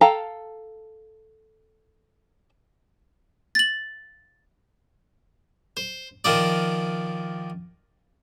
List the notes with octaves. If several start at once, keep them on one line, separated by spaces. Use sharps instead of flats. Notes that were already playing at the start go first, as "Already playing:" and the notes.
A4 F5 G5 A5 A#5
A6 F#7
C5
D#3 F3 D#4 D5